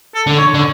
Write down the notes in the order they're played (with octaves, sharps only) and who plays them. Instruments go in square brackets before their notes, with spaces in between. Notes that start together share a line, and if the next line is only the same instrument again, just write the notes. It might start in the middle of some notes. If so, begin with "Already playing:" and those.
[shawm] A4
[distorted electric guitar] D3
[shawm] C#5
[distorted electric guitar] D3